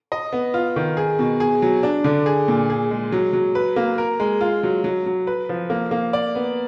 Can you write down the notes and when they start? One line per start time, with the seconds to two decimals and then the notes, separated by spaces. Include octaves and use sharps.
0.12 D#5
0.33 B3
0.54 F4
0.76 D#3
0.97 G#4
1.19 B2
1.40 G#4
1.62 F#3
1.83 D4
2.04 D3
2.26 G#4
2.48 A#2
2.70 G#4
2.91 G#3
3.12 F#3
3.33 F#3
3.55 B4
3.76 A#3
3.98 A#4
4.20 G#3
4.41 F4
4.63 F#3
4.84 F#3
5.06 F#3
5.27 B4
5.49 F3
5.70 A#3
5.91 A#3
6.13 D5
6.35 B3